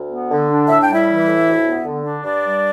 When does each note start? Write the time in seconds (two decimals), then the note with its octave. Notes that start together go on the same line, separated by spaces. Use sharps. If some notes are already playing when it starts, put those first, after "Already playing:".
Already playing: D2
0.11 B3
0.31 D3
0.50 D4
0.68 A2 E5
0.82 G5
0.88 G3
0.95 E4 E5
1.07 E3
1.27 A2
1.46 D2
1.64 B3
1.85 D3
2.03 D4
2.22 G2 D4 D5
2.42 G3